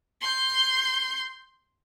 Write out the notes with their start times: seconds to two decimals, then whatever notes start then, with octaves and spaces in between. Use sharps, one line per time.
0.21 C6 G6